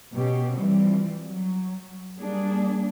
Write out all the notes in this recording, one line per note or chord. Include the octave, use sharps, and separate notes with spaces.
B2 C#4 G4
E3 F3 G3 C4
F#3
G3 A#3 D4 G#4